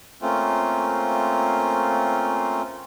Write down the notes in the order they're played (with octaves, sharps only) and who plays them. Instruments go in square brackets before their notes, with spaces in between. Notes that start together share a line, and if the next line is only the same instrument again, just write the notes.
[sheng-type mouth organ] A3 A#3 C4 C#4 F4